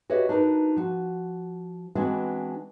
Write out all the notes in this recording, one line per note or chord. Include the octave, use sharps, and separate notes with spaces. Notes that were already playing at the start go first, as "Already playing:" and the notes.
F#4 G4 B4 C#5 D#5 E5
D4 D#4 F#4 A#4 B4
F3 F#4
E3 G#3 B3 C4 D4 F#4